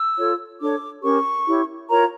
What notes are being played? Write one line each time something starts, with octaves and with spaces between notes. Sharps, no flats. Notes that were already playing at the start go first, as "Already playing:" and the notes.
Already playing: E6
F4 A4 C#5
D4 A4 C#5 D6
C#4 G4 A#4 C#5 C#6
E4 G4 C#5
F4 A#4 C#5 A#5